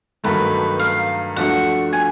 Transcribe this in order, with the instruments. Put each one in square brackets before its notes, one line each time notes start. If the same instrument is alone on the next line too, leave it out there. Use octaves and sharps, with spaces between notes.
[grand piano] G2 D#3 F#3 A3 [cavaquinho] B4
[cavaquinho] F5
[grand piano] F3 A3 D4 F#4 [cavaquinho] F#5
[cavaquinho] G#5